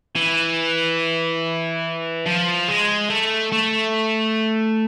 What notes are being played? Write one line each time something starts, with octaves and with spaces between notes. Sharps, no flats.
E3
F3
G#3
A3
A3